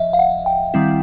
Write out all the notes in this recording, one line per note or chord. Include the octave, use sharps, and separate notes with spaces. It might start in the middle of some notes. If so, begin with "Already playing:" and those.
Already playing: F3 D#5 E5
F5
F#5
G5
D#3 G3 C4 E4